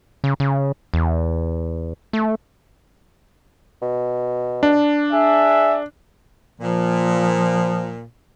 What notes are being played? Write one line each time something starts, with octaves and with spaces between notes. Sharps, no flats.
C#3
C#3
E2
A3
B2
D4
G#4 E5
A#2 F3